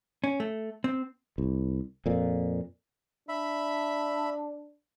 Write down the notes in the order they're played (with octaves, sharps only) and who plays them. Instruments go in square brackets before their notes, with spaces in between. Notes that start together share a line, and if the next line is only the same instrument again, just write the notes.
[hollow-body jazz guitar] C#4
A3
C4
[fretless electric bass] C2
F2 A#2
[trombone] D4 [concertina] E5 B5